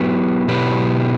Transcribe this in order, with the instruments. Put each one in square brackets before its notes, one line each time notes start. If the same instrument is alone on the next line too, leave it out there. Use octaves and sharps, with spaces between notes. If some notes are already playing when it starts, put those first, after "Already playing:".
Already playing: [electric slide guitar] F#3 B3 E4 G4 B4
B2 F#3 B3 E4 G4 B4